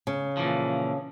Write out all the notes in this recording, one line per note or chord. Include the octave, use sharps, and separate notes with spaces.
C#3
A#2 E3 F3